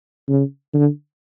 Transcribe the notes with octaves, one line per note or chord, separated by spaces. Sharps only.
C#3
D3